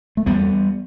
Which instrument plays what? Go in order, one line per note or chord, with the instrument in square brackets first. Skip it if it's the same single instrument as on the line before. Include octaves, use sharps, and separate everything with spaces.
[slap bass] A3
E2 G3 B3